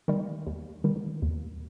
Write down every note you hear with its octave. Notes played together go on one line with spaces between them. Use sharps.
D#3 G3
D#2
D#3 G3
D#2